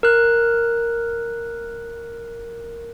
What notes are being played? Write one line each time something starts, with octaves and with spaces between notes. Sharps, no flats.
A#4 F#6